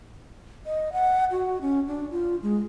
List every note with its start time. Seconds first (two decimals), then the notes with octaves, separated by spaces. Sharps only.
0.66 D#5
0.93 F#5
1.31 F#4
1.61 C#4
1.87 D4
2.11 F4
2.43 G#3